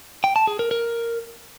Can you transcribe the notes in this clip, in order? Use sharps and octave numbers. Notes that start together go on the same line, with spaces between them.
G5
A5
G#4
A#4
A#4